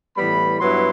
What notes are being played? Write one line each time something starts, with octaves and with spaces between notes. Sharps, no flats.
A2 E3 G3 B3 B5
G2 F#3 B3 E4 C6